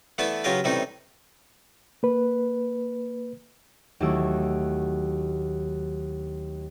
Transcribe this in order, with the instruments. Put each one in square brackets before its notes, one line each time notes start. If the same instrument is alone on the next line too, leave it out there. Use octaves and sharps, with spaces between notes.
[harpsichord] E3 A3 B3 D4 E4 B4
C#3 F#3 F4 G4 A#4 B4
A2 C3 E3 G3 C#4 D#4
[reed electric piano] A#3 B4
[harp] D#2 F#3 A3 E4 E6 D7